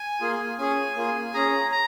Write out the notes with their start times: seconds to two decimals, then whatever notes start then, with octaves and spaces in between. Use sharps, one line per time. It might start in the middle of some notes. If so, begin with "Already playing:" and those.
Already playing: G#5
0.21 A#3 F4 G#4
0.58 C#4 G#4 G#5
0.96 A#3 F4 G#4
1.34 C#4 G#4 A#5
1.71 A#5